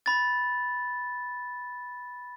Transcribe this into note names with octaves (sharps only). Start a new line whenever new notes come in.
B5 A6